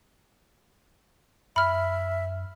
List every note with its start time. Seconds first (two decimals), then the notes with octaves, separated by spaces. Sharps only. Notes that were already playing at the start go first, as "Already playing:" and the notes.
1.56 F#2 E5 B5 F6